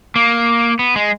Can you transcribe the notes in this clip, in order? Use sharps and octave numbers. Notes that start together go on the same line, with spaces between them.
A#3
B3
G#3